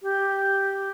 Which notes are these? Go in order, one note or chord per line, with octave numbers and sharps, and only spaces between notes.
G4